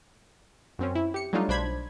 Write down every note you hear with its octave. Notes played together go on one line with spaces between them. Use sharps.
F#2 C4 C#4
E4
G4 C#7
F#3 G3 A3 D4 D#4 F4
B1 D4 C5 B5 G#6